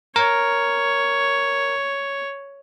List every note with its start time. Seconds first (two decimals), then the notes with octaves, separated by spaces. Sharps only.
0.16 A#4 C#5